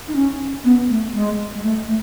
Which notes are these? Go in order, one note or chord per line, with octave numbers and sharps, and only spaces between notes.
D#4
C#4
B3
A3
G#3
G#3
A3
A3